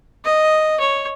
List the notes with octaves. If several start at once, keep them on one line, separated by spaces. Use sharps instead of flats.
D#5
C#5